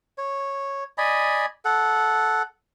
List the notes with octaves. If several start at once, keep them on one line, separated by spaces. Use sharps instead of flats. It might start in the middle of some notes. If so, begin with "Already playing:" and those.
C#5
D5 D#5 G#5 B5
A4 F#5